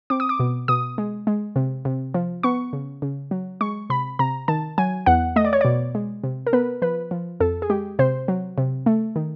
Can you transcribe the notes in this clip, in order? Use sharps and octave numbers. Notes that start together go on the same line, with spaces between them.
C4 D6
D#6
D6
B2
B2 D#6
G#3
G#3
C3
C3
F3
B3 C#6
C#3
C#3
F#3
G#3 C#6
C3 B5
C3 A#5
D#3 A5
F#3 G#5
E2 F#5
A3 D#5
D5
C#5
B2 D5
G#3
C3
A#4
B3 B4
F3 B4
F3
F2 A4
G#4
G#3 G4
C3 C5
F#3
C3
A3
D#3